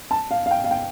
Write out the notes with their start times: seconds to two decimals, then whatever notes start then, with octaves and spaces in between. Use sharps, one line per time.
0.11 A5
0.31 F5
0.46 F5
0.51 G5
0.64 F5
0.71 G5